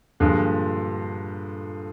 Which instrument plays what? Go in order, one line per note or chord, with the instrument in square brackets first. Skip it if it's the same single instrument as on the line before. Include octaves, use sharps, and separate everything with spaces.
[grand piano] G2 A#2 [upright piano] D3 F3 G#3